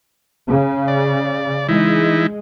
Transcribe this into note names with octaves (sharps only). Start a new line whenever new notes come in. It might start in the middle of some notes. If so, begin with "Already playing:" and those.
C#3
D5
E3 G#3 D#4 E4